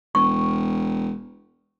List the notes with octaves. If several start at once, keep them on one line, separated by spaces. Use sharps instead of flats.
E1 C#6